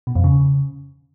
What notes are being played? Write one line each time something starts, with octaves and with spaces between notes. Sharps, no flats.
B2
F2
C#3